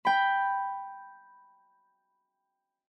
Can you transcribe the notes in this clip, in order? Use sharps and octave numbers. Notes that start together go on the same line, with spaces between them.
G5 B5